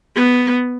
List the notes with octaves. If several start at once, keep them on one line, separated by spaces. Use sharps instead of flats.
B3